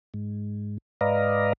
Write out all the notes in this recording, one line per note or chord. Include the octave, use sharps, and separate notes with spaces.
G#2
G#2 B4 D5 D#5 F5 A#5